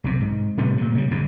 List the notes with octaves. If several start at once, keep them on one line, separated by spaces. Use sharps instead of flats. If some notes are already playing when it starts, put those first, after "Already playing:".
B1 C3
G#2
A2 C3 G3 B3
G2 A#2
C#3 G3
G1 F2 G#2